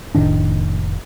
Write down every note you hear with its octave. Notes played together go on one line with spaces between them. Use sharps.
F1 A2 D#3 D4